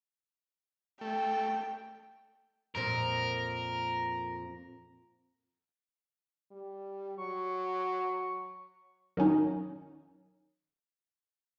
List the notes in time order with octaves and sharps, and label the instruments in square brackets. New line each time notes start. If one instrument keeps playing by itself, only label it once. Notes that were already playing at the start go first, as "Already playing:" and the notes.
[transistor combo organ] A3 [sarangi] G5
[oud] F2 A#2 C4 [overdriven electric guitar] A#4
[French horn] G3
[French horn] F#3 [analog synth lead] C#6
[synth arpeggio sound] D#3 F#3 C#4 D#4